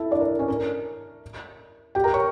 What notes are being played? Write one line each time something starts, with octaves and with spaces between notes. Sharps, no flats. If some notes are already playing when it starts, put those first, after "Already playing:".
Already playing: E4 A4 E5 A5
D4 D5
A#4
C#4 C#5
A#4
G4 G5
A#4 A#5
C#5 C#6